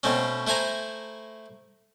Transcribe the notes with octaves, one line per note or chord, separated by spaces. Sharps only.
B2 A3 C4 C#4
A3 E4 C5 G#5 A#5